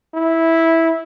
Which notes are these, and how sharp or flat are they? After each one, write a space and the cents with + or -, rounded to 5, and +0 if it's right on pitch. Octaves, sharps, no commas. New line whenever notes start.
E4 -10